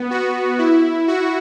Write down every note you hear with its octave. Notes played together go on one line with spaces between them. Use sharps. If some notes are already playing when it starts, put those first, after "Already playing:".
Already playing: B3
F#4
E4
F#4